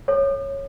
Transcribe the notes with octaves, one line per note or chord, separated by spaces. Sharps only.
A4 C#5